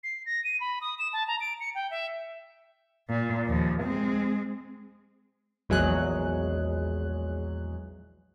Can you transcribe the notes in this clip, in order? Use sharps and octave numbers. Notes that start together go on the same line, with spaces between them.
C7
A#6
D#7
B5
D#6
E7
A5
A#5
D7
C#7
G5
E5
A#2
D#2 F3
G#3 C4
A#1 E2 F#3 G#3 G#4 F#6